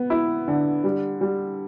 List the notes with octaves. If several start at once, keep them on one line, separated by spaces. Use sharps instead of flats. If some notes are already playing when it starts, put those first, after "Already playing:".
Already playing: B3
E4
D3
G3
G3